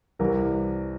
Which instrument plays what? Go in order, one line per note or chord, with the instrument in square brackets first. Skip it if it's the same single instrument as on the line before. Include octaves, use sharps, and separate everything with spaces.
[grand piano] C2 C3 E3 A#4